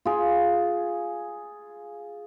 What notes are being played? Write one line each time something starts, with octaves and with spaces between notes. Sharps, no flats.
F4 G#4